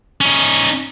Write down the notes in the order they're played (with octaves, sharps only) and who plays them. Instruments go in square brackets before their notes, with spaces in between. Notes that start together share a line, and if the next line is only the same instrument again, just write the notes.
[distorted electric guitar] C#4 D#4